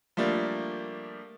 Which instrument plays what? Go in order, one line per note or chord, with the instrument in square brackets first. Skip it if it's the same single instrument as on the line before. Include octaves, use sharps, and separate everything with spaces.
[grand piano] F3 G3 A3 A#3 D4